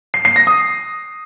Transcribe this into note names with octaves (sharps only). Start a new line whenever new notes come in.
C7
C7
A#6
D#6